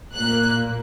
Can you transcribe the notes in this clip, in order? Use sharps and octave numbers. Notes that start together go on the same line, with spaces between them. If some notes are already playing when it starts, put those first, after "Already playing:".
A#2 A#3 F#6